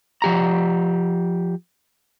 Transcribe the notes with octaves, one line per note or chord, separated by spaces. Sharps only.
F3 G4 A#5